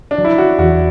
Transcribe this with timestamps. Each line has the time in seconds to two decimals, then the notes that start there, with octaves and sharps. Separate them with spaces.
0.11 D4
0.18 F#3
0.25 E4
0.38 F#4
0.58 E2 F#4